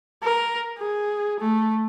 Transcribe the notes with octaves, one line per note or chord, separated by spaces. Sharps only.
A#4
G#4
A3